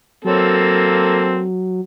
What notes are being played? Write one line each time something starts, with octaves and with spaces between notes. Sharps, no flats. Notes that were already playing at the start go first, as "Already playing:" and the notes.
F#3 A#3 C4 A4